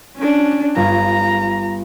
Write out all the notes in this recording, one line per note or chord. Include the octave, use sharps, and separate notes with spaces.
C#4 D4
G1 F4 A#5 G#6